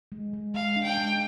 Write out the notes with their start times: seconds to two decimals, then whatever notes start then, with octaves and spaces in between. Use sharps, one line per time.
0.12 G#3
0.33 G#3
0.55 G#3 F5
0.76 D4
0.83 G5
0.98 G#3